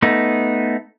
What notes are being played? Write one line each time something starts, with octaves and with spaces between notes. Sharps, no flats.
A3 B3 D#4